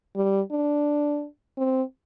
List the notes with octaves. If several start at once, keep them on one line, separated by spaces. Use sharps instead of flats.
G3
D4
C4